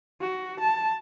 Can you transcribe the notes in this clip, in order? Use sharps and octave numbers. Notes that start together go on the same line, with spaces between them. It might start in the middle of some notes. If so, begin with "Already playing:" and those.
F#4
A5